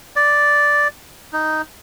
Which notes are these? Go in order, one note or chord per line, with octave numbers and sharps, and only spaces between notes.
D5
D#4